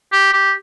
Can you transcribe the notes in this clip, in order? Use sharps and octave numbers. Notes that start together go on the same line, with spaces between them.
G4
G4